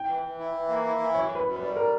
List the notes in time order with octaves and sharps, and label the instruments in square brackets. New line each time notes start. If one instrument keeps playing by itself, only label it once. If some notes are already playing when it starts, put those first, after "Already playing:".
Already playing: [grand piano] G5
[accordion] E3
E3
E4
E3
A#3
E4
E3
[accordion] F#2 [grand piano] C#5
[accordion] F#2 [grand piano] B4
[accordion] F#2
[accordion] G3 [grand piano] B4
[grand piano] A#4